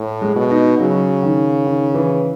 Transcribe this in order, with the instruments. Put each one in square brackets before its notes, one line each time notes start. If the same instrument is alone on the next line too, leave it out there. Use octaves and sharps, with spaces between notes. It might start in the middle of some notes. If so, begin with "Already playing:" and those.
Already playing: [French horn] A2
[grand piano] G#3
[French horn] B2
[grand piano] D#4
[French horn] C#3 [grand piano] F#3
[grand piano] D#3
D#3
E3